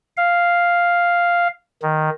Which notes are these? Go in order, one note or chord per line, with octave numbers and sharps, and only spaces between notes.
F5
D#3